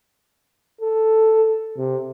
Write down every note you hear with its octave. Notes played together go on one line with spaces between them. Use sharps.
A4
C3